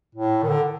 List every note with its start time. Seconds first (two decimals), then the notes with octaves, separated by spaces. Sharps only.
0.15 A2
0.43 D#3
0.49 D3